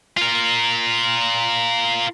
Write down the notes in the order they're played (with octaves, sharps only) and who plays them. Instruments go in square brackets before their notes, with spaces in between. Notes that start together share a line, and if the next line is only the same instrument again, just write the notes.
[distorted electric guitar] F4 A#4